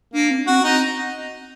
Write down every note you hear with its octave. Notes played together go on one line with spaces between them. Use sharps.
A#3 D4
C4
C4 F#4
C4 D#4